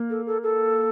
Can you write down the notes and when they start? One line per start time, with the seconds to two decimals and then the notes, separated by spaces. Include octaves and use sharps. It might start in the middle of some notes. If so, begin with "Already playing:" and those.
Already playing: A#3
0.10 A4
0.26 A4
0.43 A4